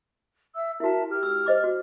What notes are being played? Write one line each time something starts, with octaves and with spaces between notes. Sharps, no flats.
E5 E6
E4 F#4 A#4 E5 A5
G4 F6
E6
C5 D#5 D6
F#4